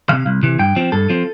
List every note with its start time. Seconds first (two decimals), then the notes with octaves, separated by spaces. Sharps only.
0.09 C3 E3 F5
0.26 C2
0.43 C3 E3
0.59 G2 G5
0.76 F3 C4
0.92 G2 A4
1.10 F3 C4